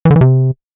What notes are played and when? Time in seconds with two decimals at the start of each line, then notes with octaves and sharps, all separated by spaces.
0.05 E3
0.11 D3
0.16 E3
0.21 C3